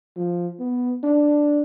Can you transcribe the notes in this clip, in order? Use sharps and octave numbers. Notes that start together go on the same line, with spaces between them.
F3
B3
D4